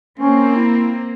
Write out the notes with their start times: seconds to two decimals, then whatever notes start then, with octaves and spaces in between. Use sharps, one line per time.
0.19 A#3 C4 C#4
0.56 E4